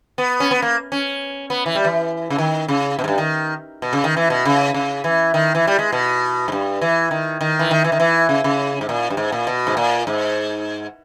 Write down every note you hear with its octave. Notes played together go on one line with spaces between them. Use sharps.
B3
C#4
B3
A#3
C#4
B3
E3
G3
E3
C#3
D#3
C#3
B2
G#2
G2
D#3
B2
C#3
D#3
E3
B2
C#3
C#3
E3
D#3
E3
G3
G#3
B2
G#2
G2
E3
D#3
D#3
E3
D#3
E3
D#3
E3
C#3
C#3
G#2
A#2
G2
G#2
A#2
B2
G#2
A#2
G#2